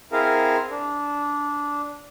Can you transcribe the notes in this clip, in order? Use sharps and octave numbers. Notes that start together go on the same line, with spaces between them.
C4 E4 G#4 A#4 F5
D4